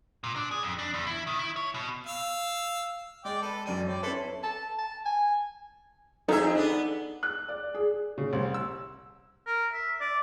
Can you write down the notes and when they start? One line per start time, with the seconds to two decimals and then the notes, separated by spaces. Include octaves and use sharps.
0.24 A#2
0.36 D4
0.51 G#4
0.63 F2
0.79 D4
0.94 E2
1.07 E4
1.27 D#3
1.39 E4
1.56 C#5
1.74 B2
2.07 F5 E6
3.25 G#3 D5 G5
3.42 A4 B4
3.66 F#2 G3 D5 D#7
3.88 C#5 D5 G5
4.03 C#4 E4 A4 B4 C6
4.44 A5
4.79 A5
5.06 G#5
6.28 F2 D#4 G#4 A4 E5 A#5
6.55 B3 D4
7.23 F#6
7.48 D5
7.75 G#4
8.18 C#3
8.33 C2
8.54 E6
9.47 A#4
9.73 E5
10.01 D5